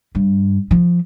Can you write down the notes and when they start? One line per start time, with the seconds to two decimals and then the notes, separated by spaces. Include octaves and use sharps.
0.15 G2
0.71 F3